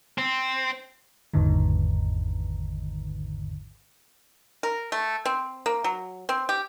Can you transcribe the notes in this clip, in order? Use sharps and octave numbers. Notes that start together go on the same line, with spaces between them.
C4
G#1 E2 G#2 D3 D#3
A#4
A3
C4
A#3
F#3
C4
G4